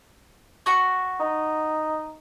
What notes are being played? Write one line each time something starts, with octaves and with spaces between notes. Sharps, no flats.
F#4 C#6
D#4